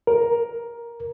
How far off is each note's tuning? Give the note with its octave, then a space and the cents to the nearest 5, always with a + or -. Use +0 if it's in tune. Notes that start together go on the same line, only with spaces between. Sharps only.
A#4 +10